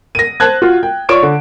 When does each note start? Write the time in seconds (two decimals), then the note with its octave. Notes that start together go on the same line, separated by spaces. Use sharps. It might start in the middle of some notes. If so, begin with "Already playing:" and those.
0.15 A#6 D#7
0.40 C5 A5 F#6 G#6
0.62 F4 F#4
0.83 G5
1.09 F4 C#5 D5 C#6 D7 E7
1.23 D3